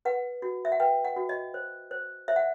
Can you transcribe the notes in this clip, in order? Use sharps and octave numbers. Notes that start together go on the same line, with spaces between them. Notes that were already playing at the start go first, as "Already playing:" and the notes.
B4 F#5
F#4
E5
F#5
B4 G5
F#5
F#4
D#5
C5
C5
C5 E5
F#5